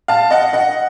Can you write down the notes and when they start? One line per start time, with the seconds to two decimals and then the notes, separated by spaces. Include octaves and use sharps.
0.08 F5 A5
0.31 D#5 F#5
0.53 D#5 F#5